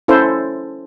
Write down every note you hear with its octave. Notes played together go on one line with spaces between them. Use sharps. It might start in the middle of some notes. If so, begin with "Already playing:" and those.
C#4 E4 A4 C5